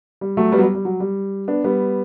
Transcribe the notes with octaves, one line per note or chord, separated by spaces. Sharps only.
G3
F#3 A3
G3 B3
F#3
G3
G3
F#3
G3
B3 D4
G3 B3